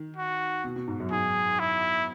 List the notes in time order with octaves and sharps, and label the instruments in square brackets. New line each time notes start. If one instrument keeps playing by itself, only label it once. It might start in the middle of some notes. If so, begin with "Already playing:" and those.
Already playing: [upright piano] D#3
[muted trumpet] F#4
[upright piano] B2
B2
G#2
F#2
[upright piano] G#2 [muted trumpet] G#4
[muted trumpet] E4